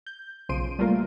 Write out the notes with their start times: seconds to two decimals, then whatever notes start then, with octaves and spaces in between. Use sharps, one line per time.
0.07 G6
0.49 B1 C#3 F3 C6 D7 D#7
0.79 G3 A3 A#3 F4 A#4